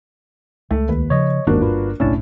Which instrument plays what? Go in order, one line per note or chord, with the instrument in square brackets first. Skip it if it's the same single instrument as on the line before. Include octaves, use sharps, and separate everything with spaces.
[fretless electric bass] C#2 [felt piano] A3
[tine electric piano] D#2 [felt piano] B4
[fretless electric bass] C#3 F3 [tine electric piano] C#5 D#5
[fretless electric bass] G1 [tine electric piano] D#2 G#2 [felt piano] A#3 D4 F#4
[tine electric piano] F4 B4
[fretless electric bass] F#1 B1 [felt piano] A2 [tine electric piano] C#4 D4 A5